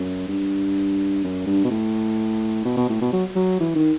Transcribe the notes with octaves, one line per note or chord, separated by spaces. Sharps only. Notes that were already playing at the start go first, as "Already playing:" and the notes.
Already playing: F#2
G2
F#2
G2
B2
A2
B2
B2
A2
B2
F#3
F#3
E3
D#3